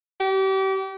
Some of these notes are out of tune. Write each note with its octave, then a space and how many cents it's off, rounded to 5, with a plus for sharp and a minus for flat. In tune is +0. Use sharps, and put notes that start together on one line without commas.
G4 -35